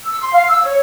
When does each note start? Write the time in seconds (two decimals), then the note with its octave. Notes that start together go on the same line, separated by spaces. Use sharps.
0.05 E6
0.20 C6
0.33 F5
0.49 E6
0.63 C#5